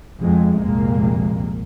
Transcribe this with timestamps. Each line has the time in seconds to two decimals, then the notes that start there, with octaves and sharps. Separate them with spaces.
0.20 F2 G#3
0.59 C2 F2 A#2 G#3 A#3